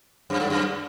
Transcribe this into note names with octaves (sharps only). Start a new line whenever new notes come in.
F#2
G2
F#2